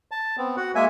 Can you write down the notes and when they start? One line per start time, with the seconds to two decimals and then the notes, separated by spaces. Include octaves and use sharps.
0.11 A5
0.38 B3 C4
0.57 F#4 F#5
0.75 G#3 A#3 E5 G#5